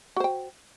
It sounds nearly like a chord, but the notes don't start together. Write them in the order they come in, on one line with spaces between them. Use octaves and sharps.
F#4 C5 G5